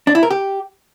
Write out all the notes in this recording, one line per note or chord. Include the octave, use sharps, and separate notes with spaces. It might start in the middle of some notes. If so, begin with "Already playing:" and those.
D4
E4
A#4
G4